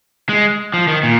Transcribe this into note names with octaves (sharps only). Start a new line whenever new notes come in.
G#3
F3
D#3
A#2